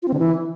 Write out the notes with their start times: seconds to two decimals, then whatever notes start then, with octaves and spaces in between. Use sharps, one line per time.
0.03 F4
0.08 C4
0.13 D3
0.19 E3